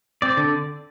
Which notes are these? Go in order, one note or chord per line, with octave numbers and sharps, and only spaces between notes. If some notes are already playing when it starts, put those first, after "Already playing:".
C4 D5
D3